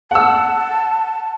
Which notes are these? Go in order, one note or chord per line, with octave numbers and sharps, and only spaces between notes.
F#5 A5 E6